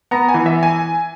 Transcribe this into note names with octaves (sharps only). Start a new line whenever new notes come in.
B3 A#5
G#5
E3
E5
G#5